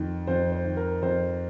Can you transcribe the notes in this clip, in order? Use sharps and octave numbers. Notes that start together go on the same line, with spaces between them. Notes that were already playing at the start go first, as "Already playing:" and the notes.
Already playing: F2 D#3
F2 C5
C5
D#3
A#4
F2 C5